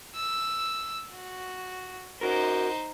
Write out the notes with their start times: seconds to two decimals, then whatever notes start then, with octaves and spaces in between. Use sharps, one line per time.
0.16 E6
1.13 F#4
2.21 D#4 F#4 A#4 C5